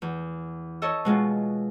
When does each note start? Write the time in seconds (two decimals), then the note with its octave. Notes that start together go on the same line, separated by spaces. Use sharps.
0.02 E2
0.82 A4 C#5 D#5 E6
1.05 B2 G#3 B3 F4